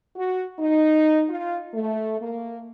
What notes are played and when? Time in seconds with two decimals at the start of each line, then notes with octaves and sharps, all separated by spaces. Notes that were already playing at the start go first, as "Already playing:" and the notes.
0.16 F#4
0.59 D#4
1.29 F4
1.73 A3
2.20 A#3